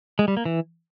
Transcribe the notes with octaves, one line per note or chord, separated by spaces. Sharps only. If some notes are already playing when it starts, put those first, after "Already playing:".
G#3
G3
A#3
E3